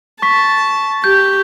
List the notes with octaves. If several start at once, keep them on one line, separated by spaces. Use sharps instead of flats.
A5 C#6 B6
G4 G6